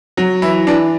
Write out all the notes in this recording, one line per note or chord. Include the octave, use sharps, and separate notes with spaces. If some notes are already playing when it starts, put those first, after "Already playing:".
F#3
E3 E4
E3 D4